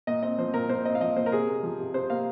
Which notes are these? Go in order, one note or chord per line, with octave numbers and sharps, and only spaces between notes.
A#2 D#5
C4 D#5
F3 C5
A#2 A#4
A#2 C5
C4 D#5
F5
F3 D#5
A#2 C5
A#4
C3 G#4
A#3
F3
C3
C3 C5
A#3 F5